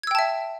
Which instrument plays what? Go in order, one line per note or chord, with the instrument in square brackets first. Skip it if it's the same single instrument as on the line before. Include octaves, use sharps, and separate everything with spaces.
[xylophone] G#6
E6
G5
A5
E5